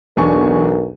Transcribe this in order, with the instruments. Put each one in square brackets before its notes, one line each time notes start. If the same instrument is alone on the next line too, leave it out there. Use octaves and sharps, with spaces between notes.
[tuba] B1 [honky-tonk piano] E2 G#5 C#6 [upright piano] D4 [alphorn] A#4